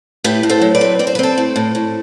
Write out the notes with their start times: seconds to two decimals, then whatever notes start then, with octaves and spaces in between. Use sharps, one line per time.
0.24 A2 G4 B4
0.43 A2
0.49 A4 C5
0.61 F#3
0.75 B4 D5
0.81 C4
0.99 C4 D5
1.07 C5
1.15 B4
1.19 C4 A4 C5
1.38 A2
1.56 A2
1.75 A2